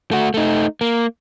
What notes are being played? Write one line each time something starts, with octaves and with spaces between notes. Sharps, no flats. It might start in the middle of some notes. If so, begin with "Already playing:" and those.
A3 F#4
A3 D#4
A#3